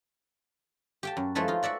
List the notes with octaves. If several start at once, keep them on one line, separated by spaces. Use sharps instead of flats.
G4 G5 A5
F#2
F3 G#3 A3 E4 A4 B4
D#4 F4
F#4 D5 E5 F#5